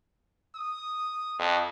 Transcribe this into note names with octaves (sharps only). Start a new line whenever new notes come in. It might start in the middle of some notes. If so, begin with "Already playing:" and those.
D#6
F2